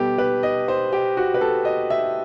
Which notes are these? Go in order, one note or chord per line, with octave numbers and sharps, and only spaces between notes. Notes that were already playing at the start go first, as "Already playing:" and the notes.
Already playing: B2 G3 B3 G4 A4
B4
D#5
C5
G4
F#4
B4
A4
D#5
E5